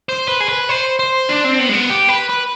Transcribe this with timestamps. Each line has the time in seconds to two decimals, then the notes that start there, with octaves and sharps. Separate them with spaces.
0.09 C5
0.28 B4
0.40 G#4
0.49 B4
0.69 C5
0.99 C5
1.29 D4
1.44 C4
1.59 B3
1.69 G#3
1.73 B3
1.90 G4
2.09 B4
2.29 B4